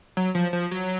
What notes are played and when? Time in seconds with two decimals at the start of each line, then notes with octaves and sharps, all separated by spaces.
0.17 F#3
0.35 F3
0.53 F3
0.71 F#3